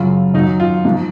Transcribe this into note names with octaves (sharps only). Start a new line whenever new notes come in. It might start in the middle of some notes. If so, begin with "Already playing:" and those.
Already playing: F#2 C#3 F#3 F4
F#2 D#3 F#3 D#4
F4
G#2 F3